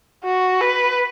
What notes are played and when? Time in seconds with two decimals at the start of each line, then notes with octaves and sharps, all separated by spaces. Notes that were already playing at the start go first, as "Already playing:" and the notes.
0.24 F#4
0.61 B4